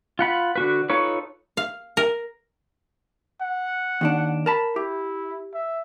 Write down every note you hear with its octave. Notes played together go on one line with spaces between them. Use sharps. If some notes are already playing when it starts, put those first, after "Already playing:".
F4 F#5 B5
D3 F#4 B4
D#4 F4 A4 B4 C#5
F5
A#4
F#5
D#2 D#3 D4
A#4 A5 B5
E4 G4
E5